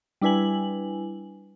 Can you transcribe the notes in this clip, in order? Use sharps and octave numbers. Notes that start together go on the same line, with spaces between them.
G3 D4 E4 B4 G#5 F#7